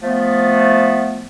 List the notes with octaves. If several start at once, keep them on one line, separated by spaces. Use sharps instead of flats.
F3 A3 B3